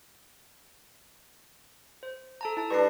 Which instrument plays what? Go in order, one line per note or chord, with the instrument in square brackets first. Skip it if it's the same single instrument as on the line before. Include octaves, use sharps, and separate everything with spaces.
[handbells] C5
A4 A5 A#5
E4 A5
[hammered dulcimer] G3 D4 [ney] B4 [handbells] C#6 A#6 C7